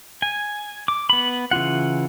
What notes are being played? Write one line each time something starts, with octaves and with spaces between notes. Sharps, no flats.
G#5
D6
B3 B5
C#3 E3 F4 F#5